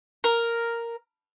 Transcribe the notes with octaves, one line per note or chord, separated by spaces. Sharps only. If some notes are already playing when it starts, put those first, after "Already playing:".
A#4